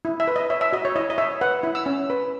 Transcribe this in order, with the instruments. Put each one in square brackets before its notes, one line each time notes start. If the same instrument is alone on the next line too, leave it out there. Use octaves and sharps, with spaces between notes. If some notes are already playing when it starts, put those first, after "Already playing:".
[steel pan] E4
E5
B4
D#5
C#5 E5
E5
F#4 D#5
C#5
E4 D#5
D#5
C#5 E5
B4 F#5
E4
E6
C#4
B4